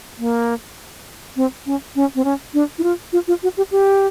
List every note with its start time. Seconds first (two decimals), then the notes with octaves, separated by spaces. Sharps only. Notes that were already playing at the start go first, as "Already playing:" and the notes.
0.18 A#3
1.36 C4
1.66 C#4
1.95 C#4
2.15 C4
2.24 C#4
2.54 D4
2.78 E4
2.83 F4
3.13 F4
3.28 F4
3.43 F#4
3.57 G4
3.71 G4